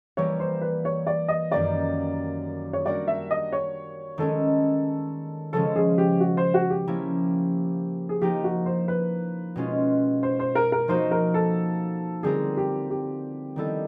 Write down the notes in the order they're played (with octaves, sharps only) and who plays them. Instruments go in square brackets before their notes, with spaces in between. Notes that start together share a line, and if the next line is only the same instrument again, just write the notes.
[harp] E3 G3 A#3 [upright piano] C#5
[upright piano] C5
B4
C#5
D5
D#5
[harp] F#2 D#3 G3 A#3 [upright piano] D5
[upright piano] C#5
[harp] G3 A#3 D4 F#4 A#4 [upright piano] D5
[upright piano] E5
D#5
C#5
[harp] D#3 G#3 C#4 [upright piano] A4
[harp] C#3 F3 G#3 C#4 [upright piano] A4
[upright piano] G#4
G4
F#4
C5
F#4
G4
[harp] F3 A#3 C#4 E4
[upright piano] G#4
[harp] F3 A#3 D#4 [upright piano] G4
[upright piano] F#4
C5
B4
[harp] B2 G#3 C#4 F4
[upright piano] C5
C5
A#4
A#4
[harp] F3 A#3 D#4 F#4 [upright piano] C5
[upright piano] A#4
A4
[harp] D3 G3 C4 F4 A#4 [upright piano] G#4
[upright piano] G4
G4
[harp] D#3 G3 B3 E4 A4